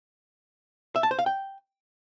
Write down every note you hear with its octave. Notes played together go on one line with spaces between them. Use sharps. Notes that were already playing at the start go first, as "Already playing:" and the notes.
E5
A5
C5
F5
G5